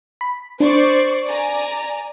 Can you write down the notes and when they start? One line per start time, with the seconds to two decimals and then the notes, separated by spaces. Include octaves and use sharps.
0.21 B5
0.60 D4 C5 D5 C#6
1.26 D5 G#5 A#5